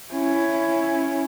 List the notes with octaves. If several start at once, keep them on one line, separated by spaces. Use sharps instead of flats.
C#4 E4